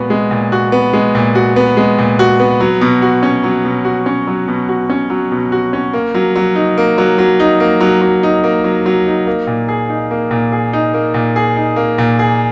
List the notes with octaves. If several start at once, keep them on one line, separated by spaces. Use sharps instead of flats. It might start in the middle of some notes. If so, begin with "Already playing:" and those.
Already playing: A#2 G#3 B3 F#4
G#3
A#2
F#4
B3
G#3
A#2
F#4
B3
G#3
A#2
F#4
B3
F#3
B2
F#4
C#4
F#3
B2
F#4
C#4
F#3
B2
F#4
C#4
F#3
B2
F#4
C#4
A#3
F#3
F#3
D#4
A#3
F#3
F#3
D#4
A#3
F#3
F#3
D#4
A#3
F#3
F#3
D#4
A#3
A#2
G#4
D#4
A#3
A#2
G#4
D#4
A#3
A#2
G#4
D#4
A#3
A#2
G#4